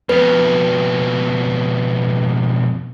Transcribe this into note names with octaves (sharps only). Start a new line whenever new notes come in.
F2 B2 B4